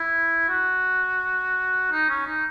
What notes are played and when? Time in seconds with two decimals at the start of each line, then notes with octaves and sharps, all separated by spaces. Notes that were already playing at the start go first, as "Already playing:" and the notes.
Already playing: E4
0.49 F#4
1.92 D#4
2.09 C#4
2.27 D#4